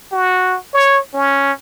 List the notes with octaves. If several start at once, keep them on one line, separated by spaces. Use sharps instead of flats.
F#4
C#5
C#4